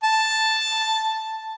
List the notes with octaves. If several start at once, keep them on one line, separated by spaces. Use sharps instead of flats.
A5